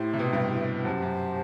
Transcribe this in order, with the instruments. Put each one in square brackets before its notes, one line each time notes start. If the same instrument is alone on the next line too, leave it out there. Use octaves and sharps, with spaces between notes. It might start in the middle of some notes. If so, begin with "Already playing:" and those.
Already playing: [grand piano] A2 [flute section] E4 G4 C5
[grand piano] C3
B2
G2
[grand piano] F#2 [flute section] G4 C5 F#5 A5
[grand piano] F#2